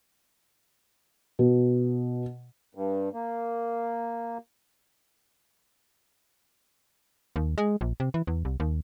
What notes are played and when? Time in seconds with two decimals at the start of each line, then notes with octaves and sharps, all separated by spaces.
1.39 B2
2.75 G2
3.14 A#3
7.36 D#2
7.58 G#3
7.81 A#1
8.00 C3
8.14 E3
8.27 E2
8.45 C2
8.60 D#2